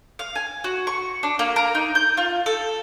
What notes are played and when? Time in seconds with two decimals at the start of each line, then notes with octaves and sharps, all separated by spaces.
0.19 F5
0.35 G#5
0.64 F#4
0.87 C#6
1.23 D4
1.39 A#3
1.56 A#4
1.75 D#4
1.95 G6
2.17 F4
2.46 A4